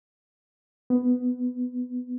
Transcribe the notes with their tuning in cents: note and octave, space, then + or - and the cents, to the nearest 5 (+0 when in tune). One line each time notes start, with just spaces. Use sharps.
B3 +10